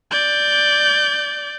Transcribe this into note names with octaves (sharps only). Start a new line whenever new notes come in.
D5 G6